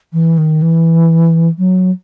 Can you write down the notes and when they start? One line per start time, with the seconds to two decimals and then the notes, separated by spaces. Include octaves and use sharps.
0.13 E3
0.38 D#3
0.62 E3
1.58 F#3